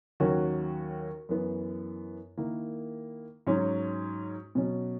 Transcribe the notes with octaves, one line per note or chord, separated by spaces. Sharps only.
D#2 D#3 F#3 C#4 F#4
F#2 E3 B3
D#3 A#3 E4
G#2 F#3 C#4
B2 F#3 C#4 F#4